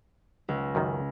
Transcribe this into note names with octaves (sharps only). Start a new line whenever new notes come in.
C#2
F#2 D#3